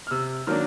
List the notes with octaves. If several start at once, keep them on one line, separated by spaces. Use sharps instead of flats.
F6
C3 E6
D#3 F#3 A#3 D4 F6